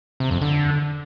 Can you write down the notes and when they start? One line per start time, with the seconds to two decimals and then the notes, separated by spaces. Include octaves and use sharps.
0.20 C3
0.31 F2
0.42 D3